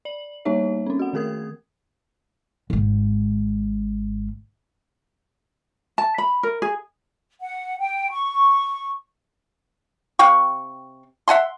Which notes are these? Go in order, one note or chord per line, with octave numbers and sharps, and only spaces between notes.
D5 F#7
G3 A#3 B3 D#4 C#5 E5
C4 C#4
F#4 F#5
D#3 A3 G#4 A#4 D#6 G#6
G#1 G#2
A5
B5
A#4
G#4
F#5
G5
C#6
C3 F5 G5 C#6
E5 F#5 G#5 C6